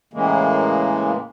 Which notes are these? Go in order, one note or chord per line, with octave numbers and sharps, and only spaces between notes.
A2 C#3 E3 G#3 A#3